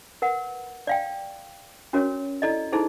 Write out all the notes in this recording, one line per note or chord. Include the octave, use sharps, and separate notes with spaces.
A#4 B4 F#5
D5 F5 G5
C#4 F#4 A#4 C#5
E4 A4 D5 D#5
D#4 E4 G#4 A4 C5